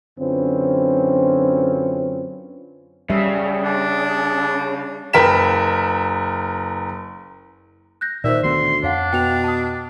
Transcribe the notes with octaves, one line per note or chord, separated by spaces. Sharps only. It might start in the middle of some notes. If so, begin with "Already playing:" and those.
F#2 D3 C4 C#4 F4 B4
C#3 G3 E5
D4
F#1 A#4 B4 G5 B6 E7
F#6 G6 A#6
A#2 D#3 C5 D5 E5
D2 D#3 B3 C6
F2 D4 C#5 F5 F#5
B2 G5 F7
A5 D#6